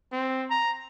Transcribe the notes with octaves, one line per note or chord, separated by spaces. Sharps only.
C4
A#5